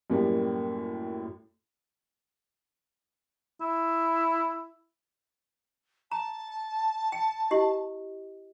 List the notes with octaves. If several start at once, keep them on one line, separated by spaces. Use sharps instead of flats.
F#2 A2 G3 A#3
E4
A5 A#5
G5
E4 G4 D#5